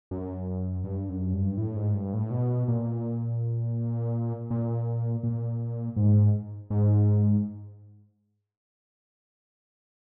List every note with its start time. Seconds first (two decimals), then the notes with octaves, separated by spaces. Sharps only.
0.11 F#2
0.84 G2
1.09 F#2
1.33 G2
1.57 A2
1.76 G#2
1.94 G2
2.13 A2
2.31 B2
2.68 A#2
4.51 A#2
5.23 A#2
5.96 G#2
6.70 G#2